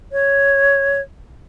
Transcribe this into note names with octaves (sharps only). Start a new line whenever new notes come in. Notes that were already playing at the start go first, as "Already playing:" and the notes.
C#5